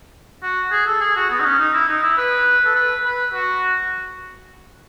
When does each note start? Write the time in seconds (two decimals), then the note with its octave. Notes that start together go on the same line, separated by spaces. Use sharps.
0.43 F#4
0.72 G#4
0.86 A4
1.01 G#4
1.16 F#4
1.30 B3
1.40 D#4
1.45 C#4
1.59 D#4
1.74 E4
1.88 D#4
2.03 E4
2.18 B4
2.65 A4
2.75 B4
3.05 B4
3.33 F#4